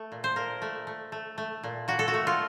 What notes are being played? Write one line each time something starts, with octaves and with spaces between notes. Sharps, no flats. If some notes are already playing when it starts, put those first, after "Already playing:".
Already playing: A3
A#2
C5
A#2 A#4
A3
A3
A3
A3
A#2
A#2 F#4
A4
F#4
A3
F4